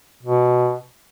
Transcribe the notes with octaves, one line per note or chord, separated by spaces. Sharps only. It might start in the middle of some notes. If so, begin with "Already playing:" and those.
B2